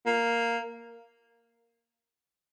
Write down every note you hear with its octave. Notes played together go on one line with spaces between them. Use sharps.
A#3